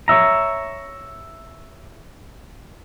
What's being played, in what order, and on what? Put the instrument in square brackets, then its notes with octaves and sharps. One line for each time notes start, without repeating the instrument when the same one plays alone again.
[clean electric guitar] C#5 D#5 E5 A#5